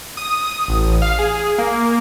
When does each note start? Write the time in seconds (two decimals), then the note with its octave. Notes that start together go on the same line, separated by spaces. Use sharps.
0.17 D#6
0.68 A1
1.02 F5
1.19 G#4
1.58 A#3